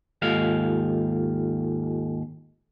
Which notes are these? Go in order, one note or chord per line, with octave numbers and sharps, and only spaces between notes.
D#2 G#2 F4 G4 A4 F5